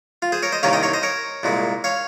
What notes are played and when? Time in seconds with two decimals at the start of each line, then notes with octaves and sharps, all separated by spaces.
0.22 F4
0.32 G#4 C5
0.42 A#4 C#5
0.52 C5 D#5
0.63 C2 C3 D#3 A#3 C#4 C#5 F5
0.73 D#5 G5
0.83 C#5 F5
0.93 C5 D#5
1.03 A#4 C#5
1.43 C2 A#2 G#3
1.84 C#5 F5